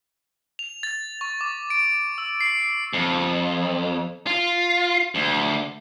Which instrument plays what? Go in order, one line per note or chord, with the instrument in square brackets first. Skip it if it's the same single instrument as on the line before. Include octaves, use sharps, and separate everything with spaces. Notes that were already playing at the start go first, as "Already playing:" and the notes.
[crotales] F7
A6
C#6
D6
D7
E6
C7
[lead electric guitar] F2
F4
D2